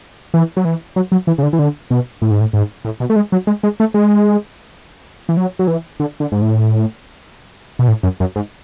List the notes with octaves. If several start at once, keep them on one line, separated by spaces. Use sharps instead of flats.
E3
F#3
E3
F#3
F#3
E3
C#3
D3
E3
D3
B2
A2
G#2
A2
G#2
A2
B2
A3
G#3
F#3
G#3
G#3
A3
G#3
E3
F#3
F#3
E3
D3
D3
G#2
A2
B2
A2
F#2
F#2
G#2